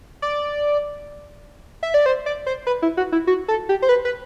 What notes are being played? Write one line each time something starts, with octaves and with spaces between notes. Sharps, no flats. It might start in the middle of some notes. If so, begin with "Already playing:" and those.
D5
E5
D5
C5
D5
C5
B4
E4
F#4
E4
F#4
A4
G4
C5
B4
B4